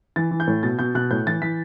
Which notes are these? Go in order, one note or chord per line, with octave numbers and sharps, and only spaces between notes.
E3 A6
E3
G6
A2
B2 A6
B2 G6
B2 F#6
A2 G6
E3 A6
E3 B6